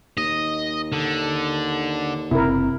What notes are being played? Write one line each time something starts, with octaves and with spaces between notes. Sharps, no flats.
D#2 D#5
D3
F#1 C3 E4 A#4